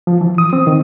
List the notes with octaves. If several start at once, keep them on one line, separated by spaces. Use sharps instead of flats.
F3
E3
D#6
C4
D#3